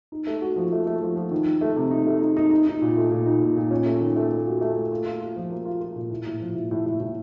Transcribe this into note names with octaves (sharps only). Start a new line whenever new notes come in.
D#4
A3
F#4
F3
A3
A3
F3
F3
D#3
D#3
A3
C3
D#4
A3
D#4
D#4
D#4
D#4
A#2
A3
A#2
D#4
A#2
A#2
C#4
A3
D#3
A3
A3
F#4
A3
A3
F4
F4
F4
F3
A#3
F4
F4
A#2
A2
A2
F3
A2
A2
A2
A2